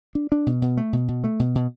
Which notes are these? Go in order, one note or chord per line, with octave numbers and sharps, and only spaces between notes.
D4
D4
B2
B2
A3
B2
B2
A3
B2
B2